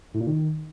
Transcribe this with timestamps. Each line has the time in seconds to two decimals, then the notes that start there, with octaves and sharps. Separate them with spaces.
0.14 A2
0.20 A#2
0.27 D#3